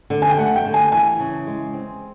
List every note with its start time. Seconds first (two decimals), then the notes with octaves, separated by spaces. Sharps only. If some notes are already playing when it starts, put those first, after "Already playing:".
0.10 D3
0.22 G#5
0.30 G5
0.38 A3 F#5
0.56 G5
0.65 D3
0.74 G#5
0.92 E3 G#5
1.20 C#3
1.47 G#3
1.73 C4